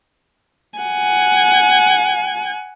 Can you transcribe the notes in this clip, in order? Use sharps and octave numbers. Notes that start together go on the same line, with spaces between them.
F#5 G#5